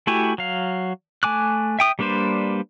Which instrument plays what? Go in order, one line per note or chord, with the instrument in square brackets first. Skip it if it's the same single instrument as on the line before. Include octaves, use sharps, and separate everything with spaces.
[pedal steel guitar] A3 E4 F#4 G4 G#5
F#3 F5
A3 G#5 D6 F#6
E5 G5 D#6
G3 A#3 D4 B4 C5